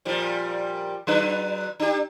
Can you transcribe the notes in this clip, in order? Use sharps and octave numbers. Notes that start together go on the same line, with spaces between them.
A#2 F3 G3
F#3 D4 B4
D4 G4